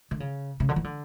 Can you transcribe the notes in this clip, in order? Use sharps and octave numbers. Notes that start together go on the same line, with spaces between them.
D3
C#3
C#3
D3
E3
D3